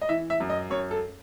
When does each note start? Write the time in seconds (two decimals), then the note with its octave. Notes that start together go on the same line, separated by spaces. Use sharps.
0.02 D#5
0.09 E3 E5
0.30 E5
0.40 F#2
0.50 D#5
0.70 F#2 C#5
0.91 A4